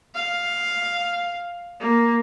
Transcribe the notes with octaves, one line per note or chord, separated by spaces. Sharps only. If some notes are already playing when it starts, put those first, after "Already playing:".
F5
A#3